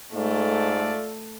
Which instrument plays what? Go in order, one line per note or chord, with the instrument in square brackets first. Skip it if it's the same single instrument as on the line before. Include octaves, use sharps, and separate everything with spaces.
[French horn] G#2 [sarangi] A3 [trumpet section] F4 A4 D5